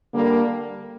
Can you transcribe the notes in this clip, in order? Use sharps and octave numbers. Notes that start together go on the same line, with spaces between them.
D3 G3 A#3